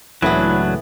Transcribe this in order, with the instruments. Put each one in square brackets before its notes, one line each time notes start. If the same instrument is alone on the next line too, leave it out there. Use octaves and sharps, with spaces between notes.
[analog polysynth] C#2 A2 [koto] E3 B3 [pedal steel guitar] F#3 D4 [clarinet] E4